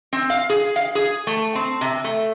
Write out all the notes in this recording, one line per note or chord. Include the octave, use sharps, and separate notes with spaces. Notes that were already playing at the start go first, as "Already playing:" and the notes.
C4
F5
G#4
F5
G#4
A3
C4
C3
A3